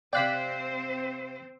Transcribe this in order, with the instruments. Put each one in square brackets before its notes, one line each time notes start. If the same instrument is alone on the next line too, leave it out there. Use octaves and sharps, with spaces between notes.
[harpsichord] C3 F5 G5 [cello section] C4 C5 [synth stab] D5 F#6 B6